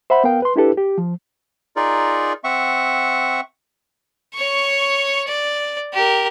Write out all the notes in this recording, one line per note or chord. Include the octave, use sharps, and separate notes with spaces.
C5 E5 F#5 B5
B3 A#4 F5 G5
B4 C6
D4 E4 G4 A4 B4
G4
F3
D#4 F4 G#4 A#4 D5
C4 E5 F#5 C#6
C#5 C#6
D5
G4 A#4